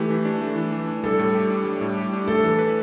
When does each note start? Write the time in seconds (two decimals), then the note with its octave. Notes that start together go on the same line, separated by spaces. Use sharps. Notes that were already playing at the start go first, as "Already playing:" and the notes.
Already playing: E3 A3 G4
0.10 E3
0.25 D4
0.42 A3
0.56 E3
0.72 E3
0.87 D4
1.04 G3 A4
1.19 A2
1.35 G4
1.50 D4
1.66 G3
1.81 A2
1.97 G4
2.13 D4
2.27 A3 A4
2.43 E3
2.59 B4